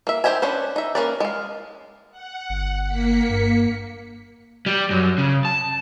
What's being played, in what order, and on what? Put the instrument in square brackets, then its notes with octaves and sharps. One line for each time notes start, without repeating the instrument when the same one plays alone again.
[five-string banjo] A#3 E5
D#3 G4 C5 E5 G#5
C#4 D4 B4 C5
D#4 E5
A#3 C#4 A#4 B4 D5
G#3 F5
[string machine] F#5
[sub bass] G1
[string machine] A#3 B6 C#7
[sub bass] G2
[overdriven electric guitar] G3
F#2
C#3
A5